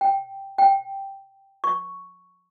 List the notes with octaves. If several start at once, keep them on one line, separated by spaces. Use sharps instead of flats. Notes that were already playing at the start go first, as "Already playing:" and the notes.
G5
G5
C#6